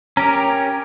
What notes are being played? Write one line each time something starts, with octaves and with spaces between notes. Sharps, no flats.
C#4 G4 A#4 A#5